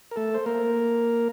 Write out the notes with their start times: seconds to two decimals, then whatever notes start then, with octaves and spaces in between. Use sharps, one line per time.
0.11 A#4
0.16 A3 A4
0.34 C5
0.46 A#3 A#4